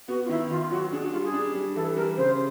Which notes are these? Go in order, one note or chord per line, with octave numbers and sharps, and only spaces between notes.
B3 F#4
F4
D#3 E4
D#3 F4
F4
F#3 F#4
D4 G#4
F#4
G3 F4
G#4
D4
G3
E3 A4
G3 A#4
C#3 C5